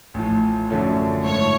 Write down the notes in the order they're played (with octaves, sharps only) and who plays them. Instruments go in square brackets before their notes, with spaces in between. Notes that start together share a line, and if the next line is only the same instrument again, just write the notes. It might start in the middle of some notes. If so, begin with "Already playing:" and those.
[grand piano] A1 A2 F3
F#2 D3 F3 A3 C#4
[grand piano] G#2 F3 A3 [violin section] C#5